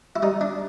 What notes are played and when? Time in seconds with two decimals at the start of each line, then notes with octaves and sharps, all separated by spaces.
0.16 E4
0.22 G3 D#4
0.41 D4